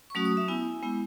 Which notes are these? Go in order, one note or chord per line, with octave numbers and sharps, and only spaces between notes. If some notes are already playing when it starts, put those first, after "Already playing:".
C#6
F#3 A3 C#4 F#4 D#6
D#6
E5
B3 E4 G#5
G#3 B3 E4